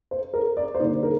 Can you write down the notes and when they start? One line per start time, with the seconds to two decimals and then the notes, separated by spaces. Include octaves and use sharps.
0.11 C5
0.34 A#4
0.57 D5
0.75 C5
0.80 D3 G3 A#3 D#4 D5
1.03 A#4